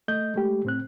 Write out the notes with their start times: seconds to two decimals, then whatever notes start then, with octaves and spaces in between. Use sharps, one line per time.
0.08 A3 D#5 G6
0.34 G#3 A3 G4
0.65 A2 C4 F#6